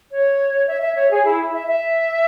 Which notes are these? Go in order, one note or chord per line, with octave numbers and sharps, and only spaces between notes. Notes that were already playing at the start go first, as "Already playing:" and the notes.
C#5
E5
E5
C#5
G#4
E4
E5
E5